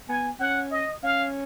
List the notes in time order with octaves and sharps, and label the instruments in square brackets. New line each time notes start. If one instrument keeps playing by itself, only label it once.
[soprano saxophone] B3 [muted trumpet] G#5
[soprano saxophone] C#4 [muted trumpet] F#5
[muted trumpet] D#5
[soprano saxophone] C#4 [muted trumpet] F5